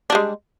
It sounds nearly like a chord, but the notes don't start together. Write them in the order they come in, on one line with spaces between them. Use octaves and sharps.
D4 G3 G#3